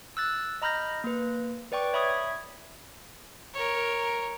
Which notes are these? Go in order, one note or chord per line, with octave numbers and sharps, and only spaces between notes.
E6 F#6 A6
D#5 A#5 B5 F6 G6 A#6
A#3 B4
B4 D5 G5 C#6 D6
C#5 E5 B5 C#6 D#6 G#6
A#4 C#5